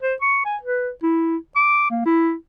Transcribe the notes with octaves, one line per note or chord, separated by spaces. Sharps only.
C5
C#6
G#5
B4
E4
D6
A#3
E4